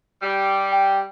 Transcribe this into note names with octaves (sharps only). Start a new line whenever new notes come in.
G3
G5